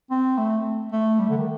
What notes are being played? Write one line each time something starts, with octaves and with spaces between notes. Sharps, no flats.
C4
A3
A3
G3
D3
D#3